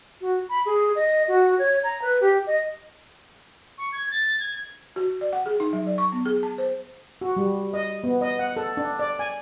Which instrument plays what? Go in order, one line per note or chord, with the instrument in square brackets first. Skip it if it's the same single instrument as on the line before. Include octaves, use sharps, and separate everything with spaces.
[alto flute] F#4
B5
G#4
D#5
F#4
C#5
A#5
B4
G4
D#5
[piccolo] C#6
G#6
A6
G#6
[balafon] F#4
D5
F#5
G#4
D#4
F#3
D5
C#6
B3
G#4
A5
C5
[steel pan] F#4
G3
D#5
B3
D#5
F#5
A4
D4
D5
G#5